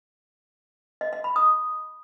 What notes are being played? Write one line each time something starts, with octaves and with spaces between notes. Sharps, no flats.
D#5
D#5
B5
D#6